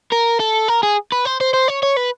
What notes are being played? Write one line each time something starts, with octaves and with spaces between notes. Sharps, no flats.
A#4
A4
A#4
G#4
B4
C5
C5
C5
C#5
C#5
B4